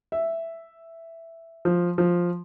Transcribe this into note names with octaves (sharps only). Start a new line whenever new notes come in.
E5
F3
F3